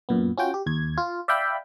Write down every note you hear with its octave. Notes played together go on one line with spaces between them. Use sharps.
F#2 A#2 B3
C#4 F4 F#4 G5
G4
D#2 G#6
F4
D5 E5 F5 G5 B5